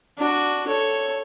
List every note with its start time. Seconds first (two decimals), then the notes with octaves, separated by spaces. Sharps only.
0.18 D4 F#4
0.67 A4 C#5